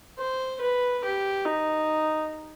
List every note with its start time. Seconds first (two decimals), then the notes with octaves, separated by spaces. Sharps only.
0.18 C5
0.61 B4
1.04 G4
1.45 D#4